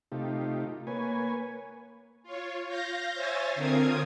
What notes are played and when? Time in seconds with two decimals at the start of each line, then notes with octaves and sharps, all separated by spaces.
0.12 C3 A3 D#4 F4 G4
0.87 A#3 B4 C#5 G#5
2.23 F4 C#5
2.68 F5 G6 A#6
3.14 C5 C#5 E5 G#5 A6
3.55 D3 C4 F4 A#4 D#6 G#6